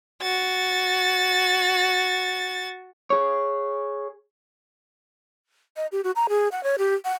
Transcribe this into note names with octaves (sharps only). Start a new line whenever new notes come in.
F#4 A6
G#4 C#5
D#5
G4
F#4
A#5
G#4
F#5
C#5
G4
F#5